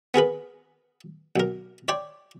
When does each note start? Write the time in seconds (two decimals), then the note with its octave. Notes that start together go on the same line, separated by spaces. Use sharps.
0.14 B3 G#4 A#4 B4
1.36 B1 A#4
1.88 C#5 D5 G5 C6